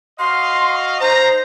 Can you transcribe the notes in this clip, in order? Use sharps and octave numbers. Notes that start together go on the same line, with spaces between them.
F#4 D#5 F5 C6
D#4 C5 A#5